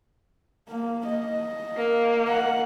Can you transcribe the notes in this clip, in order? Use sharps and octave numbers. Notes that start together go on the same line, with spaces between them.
A#3
D#5
A#3
F#5